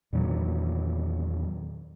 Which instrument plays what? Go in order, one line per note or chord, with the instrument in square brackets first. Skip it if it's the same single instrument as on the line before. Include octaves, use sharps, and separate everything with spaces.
[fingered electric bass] E2 A#2 D#3 F#3